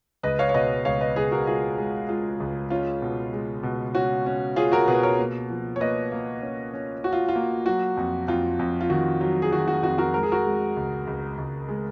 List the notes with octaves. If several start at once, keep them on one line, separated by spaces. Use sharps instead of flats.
C#2 B4 D#5
C#5 F5
C#5
B2 B4 D#5
C#2 C#5 F5
B4 D#5
C#2 G#4 B4
F#4 A#4
G#3 F4 G#4
G#3
G#3 F4
C#2
C#4 F4
B2
G#3
B2
C#4 F#4
C#4
C#4 F4 G#4
F#4 A#4
B2 G#4 B4
A#4 C#5
A#3
F3
C#5
A#3 B4 D#5
A#3
C#4
C#4
C#4 F#4
F4
F4
A#3
F#3 F#4
F2
F2 F4
F2
F4
D#3 F#4
F#3
G#4
D#3 F#4
F#4
F2 F#4
F#4 A#4
G#3 A#4
G#4
F#4 A#4
G#3
C#2
C#2
C#2
G#3